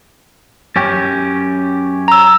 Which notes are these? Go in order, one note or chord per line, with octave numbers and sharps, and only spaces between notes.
F#2 C#4 G4
A#5 E6